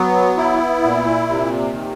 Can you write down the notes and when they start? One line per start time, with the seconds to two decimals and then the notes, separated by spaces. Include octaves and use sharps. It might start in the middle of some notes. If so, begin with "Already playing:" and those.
Already playing: F#3 B3
0.37 E4
0.83 A#2
1.29 C3
1.73 D#3